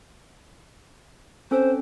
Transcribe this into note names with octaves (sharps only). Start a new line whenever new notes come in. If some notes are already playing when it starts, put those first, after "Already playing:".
C4 C#4 A4 C5